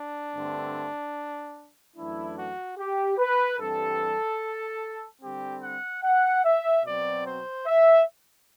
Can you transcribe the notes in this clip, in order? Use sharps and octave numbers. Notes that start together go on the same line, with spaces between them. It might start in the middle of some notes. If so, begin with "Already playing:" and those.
Already playing: D4
G2 D3 A3 C4
F#2 E3 A3 D4 E4
F#4
G4
B4
G2 E3 G3 C4 A4
D3 G3 C4 G4
F#5
F#5
E5
B2 F#3 C4 D5
C5
E5